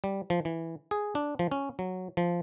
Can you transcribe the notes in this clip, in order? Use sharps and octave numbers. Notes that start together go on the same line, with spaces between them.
G3
F3
E3
G#4
D4
F3
C#4
F#3
F3